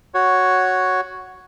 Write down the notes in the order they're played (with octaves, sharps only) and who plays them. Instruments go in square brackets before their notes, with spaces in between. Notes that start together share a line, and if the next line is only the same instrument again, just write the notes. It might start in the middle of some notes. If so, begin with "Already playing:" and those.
[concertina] F#4 C#5